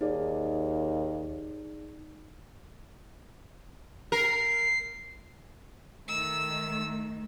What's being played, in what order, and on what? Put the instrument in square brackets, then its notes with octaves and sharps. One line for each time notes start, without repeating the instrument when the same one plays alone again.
[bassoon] D#2 [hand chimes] D#4 G#4 D5
[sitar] A#4 [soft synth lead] C7
[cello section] D#3 A3 [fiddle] E6